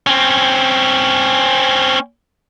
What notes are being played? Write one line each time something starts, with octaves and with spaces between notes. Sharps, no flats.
C4 C#4